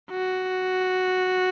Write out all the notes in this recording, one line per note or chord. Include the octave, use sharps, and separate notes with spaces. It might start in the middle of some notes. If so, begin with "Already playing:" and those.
F#4